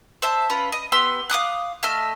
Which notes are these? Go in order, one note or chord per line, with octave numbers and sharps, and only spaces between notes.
C5 E5 A5
C#4 F4 B4
D#5
B3 G4 C6 E6
F5 D6 D#6 F#6
A3 D#5 E5 F6